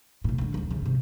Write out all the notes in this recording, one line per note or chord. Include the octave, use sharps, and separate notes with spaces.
B1 A2
F2 D3
D1 D2
C#3 E3
G2 C3